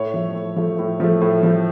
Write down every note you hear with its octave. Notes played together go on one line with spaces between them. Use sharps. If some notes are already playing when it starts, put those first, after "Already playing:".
Already playing: A2 C#5
F3 A3
A2
F3 A3
A2
F3 A3
A2
F3 A3